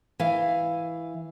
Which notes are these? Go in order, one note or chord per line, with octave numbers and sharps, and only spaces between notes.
E3 F5